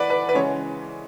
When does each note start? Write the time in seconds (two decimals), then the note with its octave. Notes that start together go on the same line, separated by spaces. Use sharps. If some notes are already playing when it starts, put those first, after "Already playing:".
Already playing: E3 B4 D5 F#5
0.10 B4
0.29 B4
0.34 C#3 E3 G#3 C#4 C#5